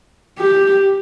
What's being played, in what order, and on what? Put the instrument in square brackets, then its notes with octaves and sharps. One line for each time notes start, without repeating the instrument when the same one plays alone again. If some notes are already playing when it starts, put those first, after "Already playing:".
[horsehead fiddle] G4